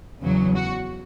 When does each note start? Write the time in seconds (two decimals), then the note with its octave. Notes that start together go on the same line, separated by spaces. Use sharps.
0.22 E2 C#3 F#3
0.56 F#4